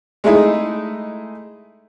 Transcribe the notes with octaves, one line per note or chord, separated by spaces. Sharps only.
G#3 A3 D#4 E4 G#4